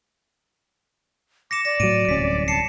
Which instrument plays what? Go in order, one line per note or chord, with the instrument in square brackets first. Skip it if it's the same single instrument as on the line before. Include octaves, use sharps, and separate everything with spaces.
[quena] D6 [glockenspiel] A#6 C#7 E7
[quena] D5 [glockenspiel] A#6
[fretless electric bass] A2 F#3 [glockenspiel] D7 D#7
[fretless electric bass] D1 C2 C#4 [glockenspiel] B6
[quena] A5 [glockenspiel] C7 C#7 E7